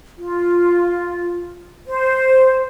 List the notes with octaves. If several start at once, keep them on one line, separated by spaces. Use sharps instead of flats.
F4
C5